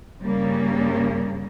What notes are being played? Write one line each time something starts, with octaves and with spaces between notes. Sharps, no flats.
G2 C#3 G3 A#3